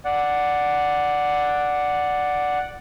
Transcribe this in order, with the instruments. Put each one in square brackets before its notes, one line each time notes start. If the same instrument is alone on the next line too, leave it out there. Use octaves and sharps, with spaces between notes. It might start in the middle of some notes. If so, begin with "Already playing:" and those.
[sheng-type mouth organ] D5 F#5